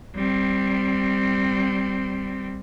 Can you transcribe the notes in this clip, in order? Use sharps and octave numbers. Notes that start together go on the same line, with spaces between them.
G3 C4